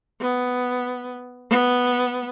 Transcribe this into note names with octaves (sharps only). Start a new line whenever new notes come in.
B3
B3